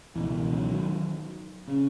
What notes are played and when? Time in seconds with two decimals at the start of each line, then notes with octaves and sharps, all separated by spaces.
0.15 C#2 B2 E3
0.52 D#3 F#3
1.68 C#3